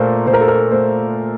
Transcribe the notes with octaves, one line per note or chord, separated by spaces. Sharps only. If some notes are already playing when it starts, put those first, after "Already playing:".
Already playing: A#2 A3 A#4 C5
A#2 C5
A#4
A4
A#4
A3 C5